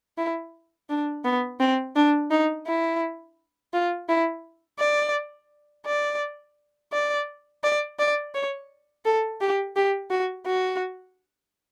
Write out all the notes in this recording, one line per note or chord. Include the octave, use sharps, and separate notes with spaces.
E4
D4
B3
C4
D4
D#4
E4
F4
E4
D5
D5
D5
D5
D5
C#5
A4
G4
G4
F#4
F#4